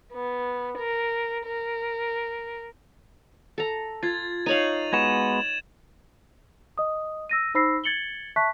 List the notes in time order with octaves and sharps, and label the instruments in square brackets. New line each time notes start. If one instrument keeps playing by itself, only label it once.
[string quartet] B3
A#4
A#4
[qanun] A4 A#5
[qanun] F4 [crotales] G#6 A6
[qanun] D#4 C#5 F5 [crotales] D#7 F7 F#7
[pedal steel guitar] G#3 B3 F#4 [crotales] G#6 E7
[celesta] D#5 D#6
E6 A#6 D#7
D#4 C5 B5 E6 A#6 C7
G#6 A6 C#7 F#7 G7
E5 A5 C#6 F#6 B6